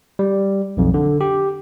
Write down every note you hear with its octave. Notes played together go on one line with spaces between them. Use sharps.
G3
B1 F2
D3
G4